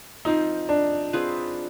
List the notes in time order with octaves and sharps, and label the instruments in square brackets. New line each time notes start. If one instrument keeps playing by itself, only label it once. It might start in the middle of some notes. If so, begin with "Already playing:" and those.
[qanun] F3 C4 F4 [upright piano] D#4
[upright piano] D4
[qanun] C4 F4 G#4 B4